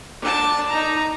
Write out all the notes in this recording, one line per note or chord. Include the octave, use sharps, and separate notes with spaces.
D4 A5
D#4 A#5